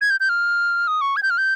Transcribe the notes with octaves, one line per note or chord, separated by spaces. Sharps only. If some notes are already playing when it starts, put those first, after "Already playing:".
G#6
G6
G6
F6
D#6
C#6
G#6
G6
F6
G6